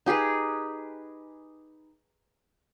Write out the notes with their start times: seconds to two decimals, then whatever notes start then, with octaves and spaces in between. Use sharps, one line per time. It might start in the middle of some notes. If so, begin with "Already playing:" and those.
0.06 D#4 G4 G#4 B4